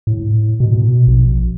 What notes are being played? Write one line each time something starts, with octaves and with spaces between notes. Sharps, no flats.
A2
B2
A#1